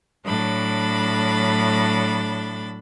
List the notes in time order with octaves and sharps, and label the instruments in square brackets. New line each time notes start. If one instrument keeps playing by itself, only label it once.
[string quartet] A2 F#3 D4 B5 A6